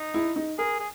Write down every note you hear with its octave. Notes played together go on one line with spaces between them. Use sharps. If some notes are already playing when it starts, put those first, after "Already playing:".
Already playing: D#4
E4
D#4
G#4 A#4
G#4